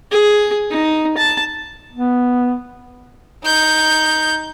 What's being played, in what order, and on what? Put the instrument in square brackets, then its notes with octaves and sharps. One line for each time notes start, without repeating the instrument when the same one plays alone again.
[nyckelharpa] G#4
D#4
A5
[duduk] B3
[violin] D#4 G6